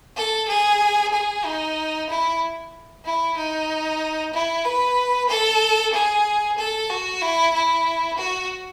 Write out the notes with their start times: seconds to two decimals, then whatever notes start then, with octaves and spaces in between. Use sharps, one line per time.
0.17 A4
0.48 G#4
1.13 G#4
1.45 D#4
2.09 E4
3.05 E4
3.37 D#4
4.33 E4
4.66 B4
5.29 A4
5.93 G#4
6.58 A4
6.90 F#4
7.22 E4
7.54 E4
8.18 F#4